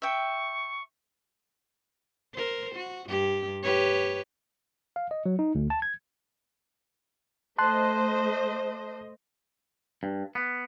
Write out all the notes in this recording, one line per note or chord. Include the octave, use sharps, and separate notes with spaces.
E5 G5 C#6
A#4 C5
F#4
G2 G4
G4 B4 C#5
F5
D#5
F#3
D#4
D2
A5
G#6
A3 C5 D#5 A5 C6 F#6
G2
B3